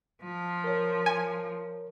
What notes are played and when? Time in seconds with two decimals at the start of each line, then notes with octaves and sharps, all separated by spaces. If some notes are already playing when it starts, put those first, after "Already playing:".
0.23 F3
0.64 A#4 C#5
1.06 G#5